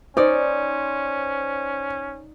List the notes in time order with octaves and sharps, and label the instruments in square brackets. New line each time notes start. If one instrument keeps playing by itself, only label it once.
[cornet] C#4 [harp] D#4 D5 [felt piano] C5